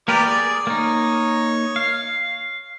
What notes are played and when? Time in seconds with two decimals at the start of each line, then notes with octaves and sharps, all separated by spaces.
0.08 A#3 G4 A#4 B4 D5
0.25 G#4 D5
0.67 A#3 D#4 C#5
1.76 F5